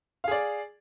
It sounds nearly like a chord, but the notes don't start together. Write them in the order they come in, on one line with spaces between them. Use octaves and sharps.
F5 G#4 D5